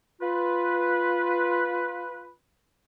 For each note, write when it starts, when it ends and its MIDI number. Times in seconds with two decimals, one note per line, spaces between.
0.21 2.31 65
0.21 2.31 71